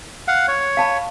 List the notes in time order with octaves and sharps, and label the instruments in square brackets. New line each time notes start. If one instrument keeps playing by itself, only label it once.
[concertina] F5 F#5
C#5
[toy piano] F5 A5 B5